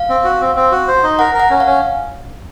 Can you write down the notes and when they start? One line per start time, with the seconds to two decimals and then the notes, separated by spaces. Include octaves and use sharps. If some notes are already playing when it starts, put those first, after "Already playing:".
Already playing: F5
0.09 C4
0.24 F#4
0.41 C4
0.56 C4
0.72 F#4
0.88 C5
1.03 D#4
1.19 A#4 F#5
1.34 A#4
1.40 F#5
1.50 C#4
1.60 F5
1.66 C#4